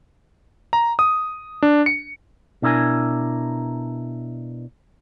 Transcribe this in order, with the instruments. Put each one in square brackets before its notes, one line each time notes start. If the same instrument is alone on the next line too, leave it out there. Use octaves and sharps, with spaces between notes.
[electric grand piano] A#5
D#6
D4
C#7
[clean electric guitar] B2 D4 E4 A#4 G#5